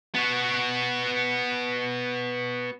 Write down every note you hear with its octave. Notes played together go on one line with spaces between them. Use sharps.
B3 F#4